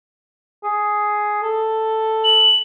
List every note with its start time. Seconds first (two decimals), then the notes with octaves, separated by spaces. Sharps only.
0.64 G#4
1.42 A4
2.24 F#7